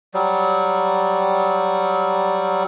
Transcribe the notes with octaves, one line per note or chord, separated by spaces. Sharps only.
F#3 G3